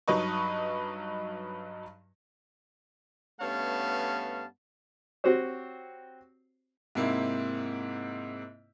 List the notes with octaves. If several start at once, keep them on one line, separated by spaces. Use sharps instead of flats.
G2 F#3 D#4 B4 D#5 C#6
G2 A3 B3 C#4 F5 A5
C4 F#4 G4 C5 C#5
G#2 C3 A#3 C4 E4